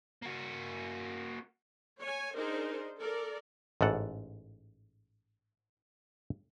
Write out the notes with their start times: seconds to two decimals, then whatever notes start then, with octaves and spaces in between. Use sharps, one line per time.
0.22 A#3 F#4
2.02 C#5 G#5
2.36 D4 D#4 G#4 A#4 C5
3.00 A4 A#4 D5
3.81 A1 G#2 A4 F#5